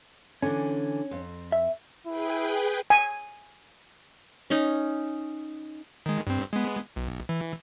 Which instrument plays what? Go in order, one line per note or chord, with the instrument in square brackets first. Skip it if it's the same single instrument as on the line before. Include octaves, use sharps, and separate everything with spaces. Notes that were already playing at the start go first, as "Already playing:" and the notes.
[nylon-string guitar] D3 E3 D4 [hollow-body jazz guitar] C#4
[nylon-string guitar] F2
[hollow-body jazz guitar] E5
[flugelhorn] E4 [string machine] G#4 B4 G5
[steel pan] G#5
[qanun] C#4 D#4
[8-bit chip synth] D#3 G#3
G2 C4
G#3 B3
B1
E3